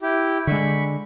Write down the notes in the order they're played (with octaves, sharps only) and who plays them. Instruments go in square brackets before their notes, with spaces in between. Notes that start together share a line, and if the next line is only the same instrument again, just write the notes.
[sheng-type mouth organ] E4 G4
[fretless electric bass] D3 G#3 [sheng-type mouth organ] B5 C#6